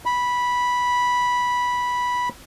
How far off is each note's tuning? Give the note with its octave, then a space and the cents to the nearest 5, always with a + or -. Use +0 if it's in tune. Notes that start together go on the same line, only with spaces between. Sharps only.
B5 -10